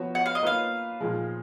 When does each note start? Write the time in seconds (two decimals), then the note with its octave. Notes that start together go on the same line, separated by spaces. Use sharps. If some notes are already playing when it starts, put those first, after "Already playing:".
Already playing: F3 B3 F#4 C#5
0.15 F#5
0.26 F5
0.35 D#5
0.43 A#3 F4 B4 F5
1.01 A#2 F3 G#3